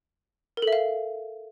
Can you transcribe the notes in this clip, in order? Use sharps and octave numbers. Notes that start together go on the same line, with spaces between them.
A#4
A4
E5
F5